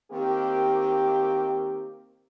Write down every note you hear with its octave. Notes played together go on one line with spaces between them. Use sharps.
D#3 A#3 C4 G4